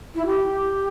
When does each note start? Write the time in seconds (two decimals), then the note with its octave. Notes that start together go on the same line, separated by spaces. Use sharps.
0.15 E4
0.26 G4